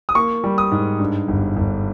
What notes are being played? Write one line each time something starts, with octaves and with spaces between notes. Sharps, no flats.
D#6
A#3 C#6
G3
D#6
G#2
G2
G1
G1